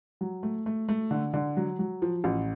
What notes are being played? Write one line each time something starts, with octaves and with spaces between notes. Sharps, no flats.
F#3
A3
A3
A3
D3
D3
F#3
F#3
F3
A1